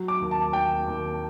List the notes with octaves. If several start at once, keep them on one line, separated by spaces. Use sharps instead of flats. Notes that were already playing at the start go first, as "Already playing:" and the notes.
Already playing: F#3
D6
D#2
A5
D#2 G5
D#2